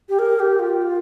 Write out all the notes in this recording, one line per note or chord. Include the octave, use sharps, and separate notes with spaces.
G4
A#4
G4
F4